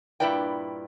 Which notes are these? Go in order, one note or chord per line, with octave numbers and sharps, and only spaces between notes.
G2 A#2 E4 B4 D5 G5